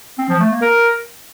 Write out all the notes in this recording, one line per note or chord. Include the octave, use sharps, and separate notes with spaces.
C4
F3
A3
A#3
A#4